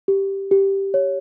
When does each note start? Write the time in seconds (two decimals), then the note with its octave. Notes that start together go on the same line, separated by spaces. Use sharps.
0.08 G4
0.51 G4
0.94 C#5